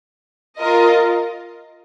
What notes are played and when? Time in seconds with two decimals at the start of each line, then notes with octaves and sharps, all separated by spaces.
0.58 F4 A#4 D#5